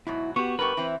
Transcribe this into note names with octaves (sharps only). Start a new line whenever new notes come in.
G#2 B2 F#3 E4
B3 F#4 G4 C#6
G2 B3 G4 A#4 B4 C#6
E3 C4 E5